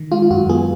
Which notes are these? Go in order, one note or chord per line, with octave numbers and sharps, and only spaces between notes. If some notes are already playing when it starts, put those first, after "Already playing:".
Already playing: D#3
G#3 F4
F4
F#2 F#4
B3 G#4